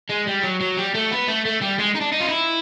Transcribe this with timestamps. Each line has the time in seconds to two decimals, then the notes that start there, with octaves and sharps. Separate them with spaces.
0.09 G#3
0.27 G3
0.43 F#3
0.60 F#3
0.77 G3
0.94 A3
1.11 B3
1.28 A3
1.45 A3
1.62 G3
1.79 G#3
1.95 D#4
2.01 D4
2.12 D#4
2.21 F4
2.29 E4